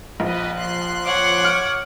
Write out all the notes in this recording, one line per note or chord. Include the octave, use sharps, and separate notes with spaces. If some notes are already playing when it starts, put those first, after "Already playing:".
A#1 B4 D#5
F3 C6 F#6
C#5 F#5 D6
F6